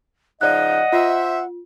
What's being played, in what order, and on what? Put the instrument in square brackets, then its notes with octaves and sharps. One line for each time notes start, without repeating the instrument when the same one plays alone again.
[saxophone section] C#3 F3 D#4 [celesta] D5 F#6 [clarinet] D#5 [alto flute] F#5
[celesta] F4 [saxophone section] C5 E5